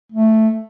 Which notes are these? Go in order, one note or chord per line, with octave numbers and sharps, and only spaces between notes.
A3